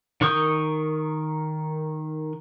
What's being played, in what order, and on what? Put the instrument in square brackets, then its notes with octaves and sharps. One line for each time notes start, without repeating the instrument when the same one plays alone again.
[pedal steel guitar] D#3 A#4 C#6 D#6 G6